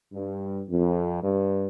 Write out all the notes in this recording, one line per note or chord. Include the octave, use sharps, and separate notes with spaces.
G2
F2
G2